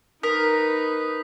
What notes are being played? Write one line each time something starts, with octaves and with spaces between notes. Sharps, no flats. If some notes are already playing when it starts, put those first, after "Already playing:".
D#4 A#4 B4 D#6 B6